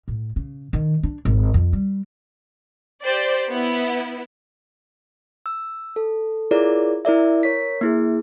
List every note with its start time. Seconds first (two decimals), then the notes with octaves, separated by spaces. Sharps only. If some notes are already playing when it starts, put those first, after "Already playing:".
0.08 A2
0.36 C#3
0.73 D#3
1.03 D4
1.25 G#1
1.54 F2
1.73 G3
3.03 G4 C5 D5
3.49 B3 E4
5.46 E6
5.96 A4
6.51 E4 F4 G#4 A#4 C#5 D5
7.05 E4 A#4 D5 E5
7.43 A#4 C#5 B6
7.81 A#3 E4 G#4